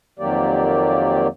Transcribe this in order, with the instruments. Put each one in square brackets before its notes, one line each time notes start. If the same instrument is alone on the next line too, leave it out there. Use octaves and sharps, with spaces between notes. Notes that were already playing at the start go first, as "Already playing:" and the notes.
[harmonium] F2 D#3 F#3 A#3 G4 D5